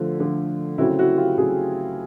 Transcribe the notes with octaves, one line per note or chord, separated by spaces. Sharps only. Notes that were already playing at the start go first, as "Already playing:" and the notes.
Already playing: D3 F3 A3
D3 F3 A3
C#3 F#3 A3 C4 E4 F#4
E4 F#4
F4 G4
C#3 F#3 A3 C4 F#4 G#4